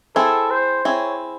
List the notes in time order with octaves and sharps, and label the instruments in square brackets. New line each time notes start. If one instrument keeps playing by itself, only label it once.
[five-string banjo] C4 E4 G#4 [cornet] A4
[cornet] C5
[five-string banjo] C4 E4 G#4 [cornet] C#5